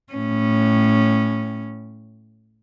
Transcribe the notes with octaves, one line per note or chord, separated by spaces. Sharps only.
A2 C#4